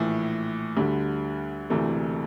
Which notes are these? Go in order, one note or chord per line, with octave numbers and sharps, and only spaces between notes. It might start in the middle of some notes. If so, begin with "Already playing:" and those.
Already playing: A#1 A2 E3
D2 D3 G3
E1 D2 C3 E3 A3